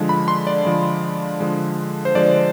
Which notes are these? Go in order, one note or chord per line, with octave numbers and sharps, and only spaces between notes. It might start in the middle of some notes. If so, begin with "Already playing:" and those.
Already playing: D3 F3 G#3
B5
C6
D5
D3 F3 G#3
D3 F3 G#3
C5
D3 F3 G#3 D5